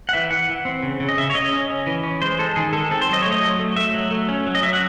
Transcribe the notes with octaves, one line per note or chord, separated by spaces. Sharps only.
F#5
E3 E5
E3 F#5
E3
C4
C#3
C#3
D#5
C#3 E5
C#5
C#3 D#5
C#4
C#4
E3
C#4
G#3 C5
G#3 A4
D#3 G#4
G#3 A4
C4 A4
C5
F#3 D#5
A3 C#5
D#5
F#3
A3
A3 E5
F#3
A3
C#4
F#3
D#5
F#3 E5
F#5